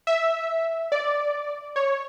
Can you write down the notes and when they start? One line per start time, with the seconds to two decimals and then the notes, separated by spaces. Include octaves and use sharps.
0.07 E5
0.92 D5
1.76 C#5